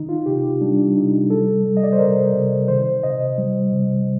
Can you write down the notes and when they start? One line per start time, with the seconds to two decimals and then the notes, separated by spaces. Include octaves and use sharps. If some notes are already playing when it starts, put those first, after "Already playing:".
Already playing: D#3 D#4
0.09 F4
0.26 C3 G4
0.61 G3 D4
0.96 C3 D#4
1.30 G3 A4
1.64 G3
1.77 D#5
1.84 D5
1.93 C5
1.99 C3 A#4
2.34 C3
2.68 D#3 C5
3.04 C3 D#5
3.38 G3
3.73 C3